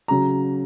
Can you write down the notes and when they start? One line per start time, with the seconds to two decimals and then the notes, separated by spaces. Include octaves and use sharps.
0.08 C#3 F#3 A#5